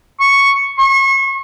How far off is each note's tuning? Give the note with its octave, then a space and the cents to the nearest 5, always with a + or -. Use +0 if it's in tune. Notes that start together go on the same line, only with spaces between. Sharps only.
C#6 +0
C#6 -35